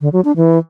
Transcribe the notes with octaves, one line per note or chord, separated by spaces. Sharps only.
D3
F#3
D4
E3